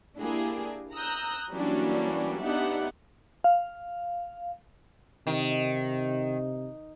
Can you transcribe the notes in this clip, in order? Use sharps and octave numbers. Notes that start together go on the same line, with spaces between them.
A#3 D4 E4 G4 G#4 A#4
A#5 D#6 E6 F#6 G6
E3 F#3 G3 A#3 C#4 D4
B3 D4 D#4 G4 E5 F#5
F5
C3 D#3